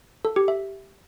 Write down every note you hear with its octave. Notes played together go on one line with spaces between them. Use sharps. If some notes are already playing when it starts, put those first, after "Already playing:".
A4
G4
E5